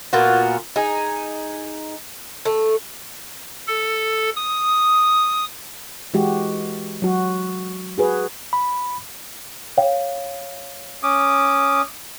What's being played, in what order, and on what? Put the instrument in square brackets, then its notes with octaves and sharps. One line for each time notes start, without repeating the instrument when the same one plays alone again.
[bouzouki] A#2 B3 F4 F#4
D#4 G#4
A3
[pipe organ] A4
D#6
[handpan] E3 G#3 F#4 G4
F#3 F#4
F#4 G#4 B4
[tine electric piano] B5
[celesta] C#5 F5 G5
[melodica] C#4 D6 D#6